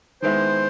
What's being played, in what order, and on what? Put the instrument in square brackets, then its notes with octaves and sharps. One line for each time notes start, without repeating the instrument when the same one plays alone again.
[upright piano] D#3 G#3 B3 E4 [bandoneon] C5